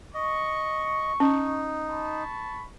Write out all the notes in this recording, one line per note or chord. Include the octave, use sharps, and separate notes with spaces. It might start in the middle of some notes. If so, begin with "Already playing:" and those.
D#5 C#6
C#4 D#4
A5 B5 C#6